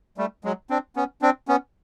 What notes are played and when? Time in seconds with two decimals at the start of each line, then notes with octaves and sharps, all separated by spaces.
0.18 G3 A3
0.44 F#3 G#3
0.70 C4 D4
0.96 B3 C#4
1.22 C4 D4
1.48 B3 C#4